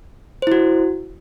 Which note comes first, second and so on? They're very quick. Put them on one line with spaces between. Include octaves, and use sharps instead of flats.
C5 E4 F#4